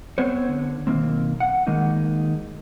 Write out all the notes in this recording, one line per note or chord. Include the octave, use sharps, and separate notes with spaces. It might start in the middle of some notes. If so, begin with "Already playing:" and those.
B3 C4 C5 C#5
D3
B1 D#3 A#3 C4
F#5
D#3 G#3 A#3 D#4